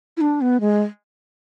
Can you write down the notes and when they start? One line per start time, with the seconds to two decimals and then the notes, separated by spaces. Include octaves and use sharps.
0.17 E4
0.21 D4
0.41 B3
0.61 G#3